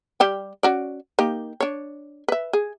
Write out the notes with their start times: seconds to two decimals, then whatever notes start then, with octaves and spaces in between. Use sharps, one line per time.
0.20 G3 G4 G5
0.63 C#4 F#4 D5
1.19 A#3 D#4 G4
1.60 D4 C#5
2.28 B4 E5
2.53 G#4